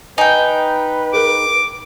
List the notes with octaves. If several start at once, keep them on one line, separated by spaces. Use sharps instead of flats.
D#4 B4 G5 G#5
G#4 A#4 D6